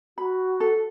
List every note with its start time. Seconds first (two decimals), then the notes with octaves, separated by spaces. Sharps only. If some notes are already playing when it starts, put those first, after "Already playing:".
0.18 F#4 B5
0.60 A4